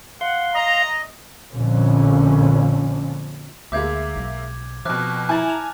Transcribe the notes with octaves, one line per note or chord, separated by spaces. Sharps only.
F5 F#5 C6
D#5 A#5
A#1 F2 A#2 D3 F3 C#4
D2 G#3 A#3 E5 D6 G6 G#6
B1
F2 B2 F3 D6 F6 F#6
E4 G#5 A#5 G6 A6
A5 F7